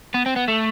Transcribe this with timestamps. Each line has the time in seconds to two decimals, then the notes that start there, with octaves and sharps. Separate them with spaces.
0.14 B3
0.26 C4
0.36 B3
0.48 A3